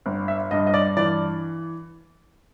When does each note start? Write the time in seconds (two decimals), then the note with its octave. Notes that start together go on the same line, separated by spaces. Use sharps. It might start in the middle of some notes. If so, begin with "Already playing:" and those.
0.06 G1
0.28 E5
0.51 G2 D#5
0.67 D#5
0.74 D5
0.97 E3 D5